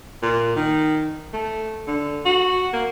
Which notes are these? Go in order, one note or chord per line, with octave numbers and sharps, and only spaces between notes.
A#2
D#3
A3
D3
F#4
A#3